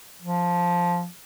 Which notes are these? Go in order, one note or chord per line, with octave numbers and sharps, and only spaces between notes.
F3